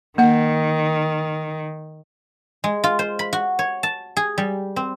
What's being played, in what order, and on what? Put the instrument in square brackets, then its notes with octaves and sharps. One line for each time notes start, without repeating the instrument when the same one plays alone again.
[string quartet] D#3 [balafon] A#3 F#5
[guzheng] G#3
F4
C5
B5
F#4
C#5
A5
G#4
G3
C4